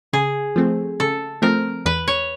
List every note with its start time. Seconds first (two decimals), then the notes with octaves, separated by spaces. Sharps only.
0.13 C#3 G#4
0.56 F3 A3 C4
1.00 C#3 A4
1.42 F3 A3 C4 A#4
1.85 E2 B4
2.08 C#5